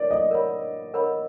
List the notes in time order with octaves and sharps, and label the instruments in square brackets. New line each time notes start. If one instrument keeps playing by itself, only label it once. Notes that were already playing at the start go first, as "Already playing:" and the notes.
Already playing: [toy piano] A#4 C#5 [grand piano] D5
[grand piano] D#5
[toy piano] A#4 C#5 F#5 B5
A#4 C#5 F#5 B5